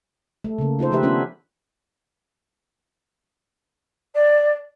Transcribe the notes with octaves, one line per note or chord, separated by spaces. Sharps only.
A3
C#3 A#3
D#4 F4 A4 C5
D#3 F3 A3 G4 B4 E5
A3 B3 C#4 D4 F4
D5